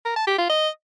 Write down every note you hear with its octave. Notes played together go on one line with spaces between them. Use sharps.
A#4
A5
G4
F4
D#5